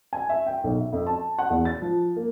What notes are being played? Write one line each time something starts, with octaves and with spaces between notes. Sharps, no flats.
G#5
E5
G5
B1
E5
F2
A5
F#5
E2
A6
F3
A#3